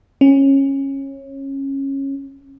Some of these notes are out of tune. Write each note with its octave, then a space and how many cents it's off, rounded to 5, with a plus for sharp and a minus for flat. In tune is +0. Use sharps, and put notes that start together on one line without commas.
C#4 -20